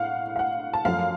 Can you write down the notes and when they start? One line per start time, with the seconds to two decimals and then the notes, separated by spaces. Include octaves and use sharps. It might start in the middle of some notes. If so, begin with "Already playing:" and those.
Already playing: A2 F5 F#5
0.36 F5
0.39 F#5
0.73 A5
0.85 F#2 F3 A3 F5